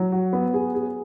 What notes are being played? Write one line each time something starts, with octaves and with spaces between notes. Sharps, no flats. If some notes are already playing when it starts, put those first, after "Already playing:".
Already playing: F#3
F#4
B3
G#4
G#4